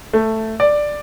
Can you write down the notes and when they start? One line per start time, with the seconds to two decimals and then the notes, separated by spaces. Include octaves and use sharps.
0.13 A3
0.60 D5